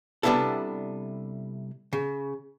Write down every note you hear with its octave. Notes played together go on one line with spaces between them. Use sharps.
C3 G3 B3 D4 E4 A4
C#3